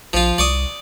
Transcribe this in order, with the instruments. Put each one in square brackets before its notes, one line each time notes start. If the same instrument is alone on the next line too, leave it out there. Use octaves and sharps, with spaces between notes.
[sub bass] A#1 [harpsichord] F3 F4
[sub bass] C2 [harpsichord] D5 C#6 D#6